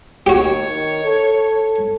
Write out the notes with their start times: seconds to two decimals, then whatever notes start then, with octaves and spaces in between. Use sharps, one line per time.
0.26 D#2 F#4 G4 C#5
0.67 D#3
1.04 A4